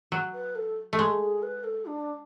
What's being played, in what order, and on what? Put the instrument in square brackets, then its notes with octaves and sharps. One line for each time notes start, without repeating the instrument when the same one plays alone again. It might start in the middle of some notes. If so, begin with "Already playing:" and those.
[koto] F#3
[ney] B4
A4
[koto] A3
G#3
[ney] G#4
B4
A4
D4